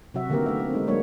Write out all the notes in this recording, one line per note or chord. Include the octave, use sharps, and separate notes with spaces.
C3 F#3 F#4 E5
D3 D#3 A#3 B3 G4 A#4
A3 E5
C4
G#3 D#4
F#3 G#3 A#3 D4 C#5